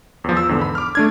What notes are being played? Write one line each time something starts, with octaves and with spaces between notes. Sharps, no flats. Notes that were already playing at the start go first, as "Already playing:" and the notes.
E2 F3
E6
E2 G#2 D3
B5
D6 F6
A3 D4 G#6